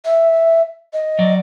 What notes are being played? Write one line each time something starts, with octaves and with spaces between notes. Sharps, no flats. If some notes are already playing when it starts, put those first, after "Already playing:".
E5
D#5
F#3 D5